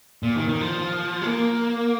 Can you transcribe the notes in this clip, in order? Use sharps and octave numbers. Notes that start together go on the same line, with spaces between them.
A#2
D#3
D#3
F3
G#3
A#3